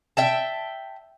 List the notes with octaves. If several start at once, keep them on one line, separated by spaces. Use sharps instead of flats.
E5 G5 A5